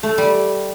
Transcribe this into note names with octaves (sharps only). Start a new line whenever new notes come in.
A3
G3